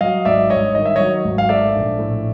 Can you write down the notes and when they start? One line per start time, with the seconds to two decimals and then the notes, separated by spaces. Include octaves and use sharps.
0.01 F#3 D#5 F5
0.25 G#1 D5 E5
0.50 G2 C#5 D#5
0.75 D#3 D#5
0.85 E5
0.96 F#3 C#5 D#5
1.24 G#1
1.38 F5
1.49 A3 D5 E5
1.74 A#1
1.99 A2